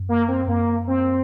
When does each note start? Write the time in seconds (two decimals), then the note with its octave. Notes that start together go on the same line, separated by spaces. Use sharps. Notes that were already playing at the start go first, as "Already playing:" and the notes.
Already playing: F#2
0.09 A#3
0.28 C4
0.48 F#2 A#3
0.87 C4